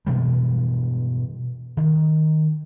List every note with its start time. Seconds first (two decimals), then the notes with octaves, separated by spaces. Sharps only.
0.07 G2 B2 E3 G3
1.77 D#3